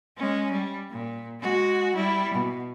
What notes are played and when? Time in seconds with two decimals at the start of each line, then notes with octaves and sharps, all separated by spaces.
0.17 G#3 C#4
0.51 G3
0.90 A#2
1.41 G#3 F#4
1.94 G3 E4
2.34 B2